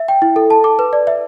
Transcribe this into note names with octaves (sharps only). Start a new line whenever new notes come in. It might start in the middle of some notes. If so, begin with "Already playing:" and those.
Already playing: E5
G5
E4
A4
A5
D6
B4
D5
E5